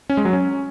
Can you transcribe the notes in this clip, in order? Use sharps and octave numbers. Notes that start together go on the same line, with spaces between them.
C#4
G#3
F#3
C#4